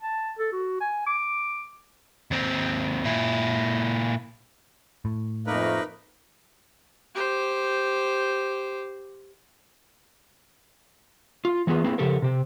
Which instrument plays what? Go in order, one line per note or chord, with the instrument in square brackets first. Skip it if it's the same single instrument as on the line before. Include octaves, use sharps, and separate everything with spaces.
[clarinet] A5
A4
F#4
G#5
D6
[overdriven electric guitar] D#2 C4
A#2 E4
[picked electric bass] A2
[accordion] F2 A3 A#3 [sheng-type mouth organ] D#4 A#4 B4
[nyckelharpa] G4 C5
[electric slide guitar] F4
E3 A3 B3 F4 G#4 B4
A#3 C4 E4 G#4 B4
C#3 F3 G4 A4 A#4
C3 G4